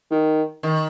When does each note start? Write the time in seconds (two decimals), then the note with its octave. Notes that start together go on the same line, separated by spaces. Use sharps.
0.11 D#3
0.63 D#3